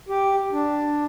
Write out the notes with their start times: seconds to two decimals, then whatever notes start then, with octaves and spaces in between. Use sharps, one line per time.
0.09 G4
0.52 D4